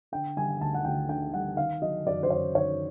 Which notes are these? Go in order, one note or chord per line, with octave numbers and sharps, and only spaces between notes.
D3 G5
G3 G#5
D2 A5
F#5
D2 G5
D3 G5
G3 F#5
D#3 F5
F#3 D#5
F#2 D5
C5
F#2 C#5
D#3 C#5